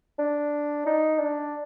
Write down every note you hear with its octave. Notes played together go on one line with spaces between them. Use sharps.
D4
D#4
D4